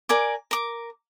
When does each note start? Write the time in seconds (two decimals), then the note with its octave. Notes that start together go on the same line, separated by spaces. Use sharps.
0.09 A#4 D5 G#5 D6
0.51 A#4 D6